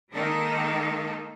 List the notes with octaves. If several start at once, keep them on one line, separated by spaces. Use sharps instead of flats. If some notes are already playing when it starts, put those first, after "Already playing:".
D#3 G#3 A#3 D#4 A4